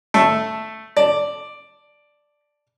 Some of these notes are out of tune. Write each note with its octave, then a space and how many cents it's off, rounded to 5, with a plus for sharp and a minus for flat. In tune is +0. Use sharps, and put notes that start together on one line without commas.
A3 +0 A4 +0
D5 +0 A5 +0